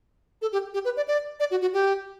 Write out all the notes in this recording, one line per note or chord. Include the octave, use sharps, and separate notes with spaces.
A4
G4
G4
B4
D5
D5
D5
F#4
F#4
G4